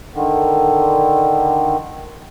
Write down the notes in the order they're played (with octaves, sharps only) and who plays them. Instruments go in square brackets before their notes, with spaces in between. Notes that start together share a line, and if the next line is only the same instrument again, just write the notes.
[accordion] D3 D#3